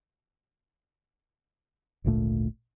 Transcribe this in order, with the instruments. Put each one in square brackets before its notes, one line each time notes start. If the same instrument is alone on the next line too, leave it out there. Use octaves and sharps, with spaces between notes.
[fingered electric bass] G#1 D2 A#2 A3